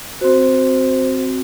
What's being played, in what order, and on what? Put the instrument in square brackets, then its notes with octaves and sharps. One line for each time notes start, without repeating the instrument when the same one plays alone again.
[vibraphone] C4 F#4 C5